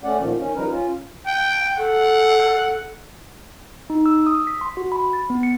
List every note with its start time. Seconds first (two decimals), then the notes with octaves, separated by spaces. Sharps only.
0.04 A3 C#4 D5 F#5
0.20 A#2 D#3 F3
0.39 D#3 C#4
0.55 F3 G3 D#4 A#4 B4
0.70 C#4 F4
1.26 G5
1.77 A4 F#5
3.90 D#4
4.06 E6
4.27 D#6
4.47 B6
4.61 C6
4.77 F#4
4.92 B5
5.13 A6
5.30 B3
5.43 C#7